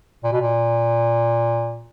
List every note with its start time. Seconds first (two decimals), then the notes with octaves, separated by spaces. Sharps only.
0.24 A#2
0.32 B2
0.41 A#2